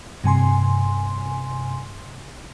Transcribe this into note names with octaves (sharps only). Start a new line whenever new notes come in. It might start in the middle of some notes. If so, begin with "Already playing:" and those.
G2 C3 G#5 C6